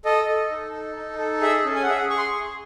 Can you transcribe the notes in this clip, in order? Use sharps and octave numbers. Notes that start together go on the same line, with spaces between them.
A4 D#5
A4
D#4
A4
D#4
A4
G#4 E5
C#4
G#5
F#5
G#4 E5
F#5
G#4 C#6
C6
C#6
G#4